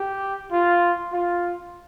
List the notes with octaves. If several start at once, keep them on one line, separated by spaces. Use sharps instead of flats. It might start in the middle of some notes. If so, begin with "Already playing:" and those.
Already playing: G4
F4
F4